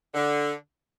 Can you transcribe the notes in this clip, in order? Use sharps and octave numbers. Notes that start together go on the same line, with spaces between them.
D3